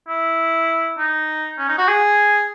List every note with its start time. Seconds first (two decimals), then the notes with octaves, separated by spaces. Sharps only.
0.08 E4
0.98 D#4
1.58 C#4
1.68 D#4
1.78 F#4
1.88 G#4